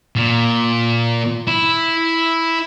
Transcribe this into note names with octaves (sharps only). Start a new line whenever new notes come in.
A#2
E4